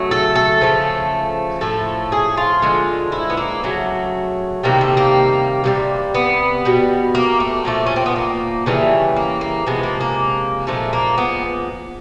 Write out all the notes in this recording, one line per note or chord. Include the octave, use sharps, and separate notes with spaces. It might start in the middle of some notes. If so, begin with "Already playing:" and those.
Already playing: C#3 F#3 A3
A4
A4
C#3 F3 A3
A2 F3 A3 A4
G#4
F4
D3 F3 G#3
E4
B3
A#3
C#3 F#3 A3
C3 D#3 G3 A#3
A3
A#3
C3 E3 G3
B3
B2 G3
A#3
A3
A#2 F3 A3
C#4
C4
B3
A#3
C#3 E3 G3 A3
A#3
A#3
C3 F3 G#3 B3
A#3
A#3
A#2 F3 G#3 A3
A#3
B3